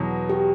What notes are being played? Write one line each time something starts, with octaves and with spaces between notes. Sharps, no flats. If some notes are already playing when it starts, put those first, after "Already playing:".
Already playing: E2 B2 F#3
G4